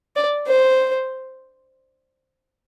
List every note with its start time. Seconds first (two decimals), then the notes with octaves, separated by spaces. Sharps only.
0.16 D5
0.47 C5